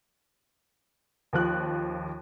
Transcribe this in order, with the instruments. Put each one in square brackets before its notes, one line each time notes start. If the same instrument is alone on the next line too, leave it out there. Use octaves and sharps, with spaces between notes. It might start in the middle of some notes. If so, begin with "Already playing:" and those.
[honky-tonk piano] D#2 F3 F#6